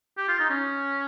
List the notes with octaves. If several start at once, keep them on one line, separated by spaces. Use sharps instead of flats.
G4
F4
D#4
C#4